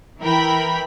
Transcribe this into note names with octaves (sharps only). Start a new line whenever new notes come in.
E3 A#4 G5 B5